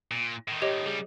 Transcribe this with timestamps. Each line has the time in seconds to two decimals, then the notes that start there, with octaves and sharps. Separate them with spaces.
0.11 A#2
0.48 A2 D#3
0.62 G4 C#5 D#5
0.86 C#3 G3 G#4